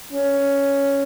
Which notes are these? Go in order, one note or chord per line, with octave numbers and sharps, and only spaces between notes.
C#4